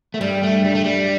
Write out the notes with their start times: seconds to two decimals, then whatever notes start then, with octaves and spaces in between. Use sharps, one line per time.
0.14 A3
0.21 G2 G3
0.43 A3
0.64 G3
0.75 A3
0.84 G3